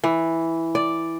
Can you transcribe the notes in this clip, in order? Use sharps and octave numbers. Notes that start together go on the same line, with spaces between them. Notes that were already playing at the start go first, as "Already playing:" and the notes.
E3
D5